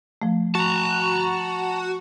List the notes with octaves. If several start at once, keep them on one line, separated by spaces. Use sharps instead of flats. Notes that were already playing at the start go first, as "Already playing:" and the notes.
F3 A3
F#4 A5 A#5